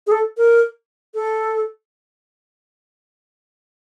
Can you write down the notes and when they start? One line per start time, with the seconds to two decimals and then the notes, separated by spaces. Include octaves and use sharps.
0.07 G#4
0.12 A4
0.37 A#4
1.14 A4